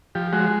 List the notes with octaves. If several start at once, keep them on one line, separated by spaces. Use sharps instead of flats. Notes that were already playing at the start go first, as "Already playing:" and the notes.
F3 G4
G#3 F#4